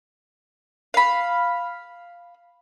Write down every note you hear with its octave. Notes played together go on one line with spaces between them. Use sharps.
F5 B5